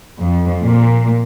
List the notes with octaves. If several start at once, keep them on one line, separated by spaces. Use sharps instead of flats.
F2
A#2